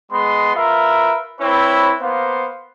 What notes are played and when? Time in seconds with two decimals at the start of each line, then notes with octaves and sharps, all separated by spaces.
0.12 G#3 B3 B5 C6
0.55 F4 A#4 B4 E5
1.40 C4 E4 B4 C#5
2.00 A#3 B3 C5 F5